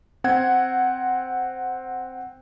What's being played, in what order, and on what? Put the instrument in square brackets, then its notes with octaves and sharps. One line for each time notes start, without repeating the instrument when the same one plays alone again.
[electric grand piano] C4 F#5 G#6